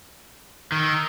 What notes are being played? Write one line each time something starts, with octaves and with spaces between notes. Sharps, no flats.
D#3 F6
E6
D#6